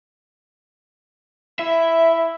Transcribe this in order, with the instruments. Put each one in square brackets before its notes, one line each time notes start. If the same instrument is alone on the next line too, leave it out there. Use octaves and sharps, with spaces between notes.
[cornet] E4 [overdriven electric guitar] E5